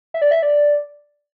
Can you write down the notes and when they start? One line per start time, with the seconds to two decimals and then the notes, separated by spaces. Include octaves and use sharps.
0.14 E5
0.22 D5
0.31 E5
0.42 D5